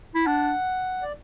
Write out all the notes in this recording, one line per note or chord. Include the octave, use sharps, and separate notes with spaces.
E4
D4 F#5
D5